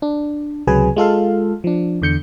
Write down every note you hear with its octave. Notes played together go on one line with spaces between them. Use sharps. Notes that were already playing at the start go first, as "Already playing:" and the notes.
D4
C#2 C3 F#3 G#4 B4 G#5
G#3 F4 A4 F5
F3 D4
E2 D3 G6 C#7